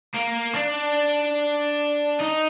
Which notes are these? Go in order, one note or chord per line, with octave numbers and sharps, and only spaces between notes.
A#3
D4
D#4